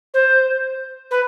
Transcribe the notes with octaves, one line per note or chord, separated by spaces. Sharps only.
C5
B4